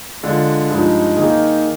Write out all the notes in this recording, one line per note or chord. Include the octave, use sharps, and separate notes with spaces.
D3 G#3 D4 F4
G2 F3 G#3 D#4
D#3 A#3 D#4 G#4